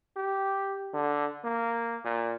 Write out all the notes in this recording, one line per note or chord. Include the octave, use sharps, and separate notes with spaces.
G4
D3
A#3
A#2